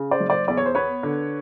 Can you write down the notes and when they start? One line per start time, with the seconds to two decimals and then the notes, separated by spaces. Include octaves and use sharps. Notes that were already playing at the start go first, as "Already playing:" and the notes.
Already playing: C#3
0.11 C5 D5
0.20 F#1
0.30 C5 D5
0.48 E2 D5
0.57 C#5
0.66 C5
0.75 B3 B4 C#5
1.03 D3